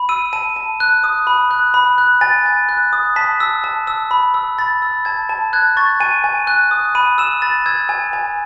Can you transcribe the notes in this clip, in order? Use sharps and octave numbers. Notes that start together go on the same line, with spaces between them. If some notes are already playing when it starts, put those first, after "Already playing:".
Already playing: B5
E6 D#7
A5 D#7
A5
F#6
D#6
B5
F#6
B5
F#6
G#5 A6
G#5
F#6
D#6
A5 B6
E6
A5
E6
B5
E6
B5 A6
E6
A5 G#6
A5
F#6 G#6
C#6 A6
G#5 D#7
G#5
F#6
D#6
B5 D#7
E6 E7
B5 A6
E6 G#6
G#5
G#5